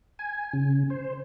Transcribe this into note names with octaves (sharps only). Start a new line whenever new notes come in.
G#5
C#3
C5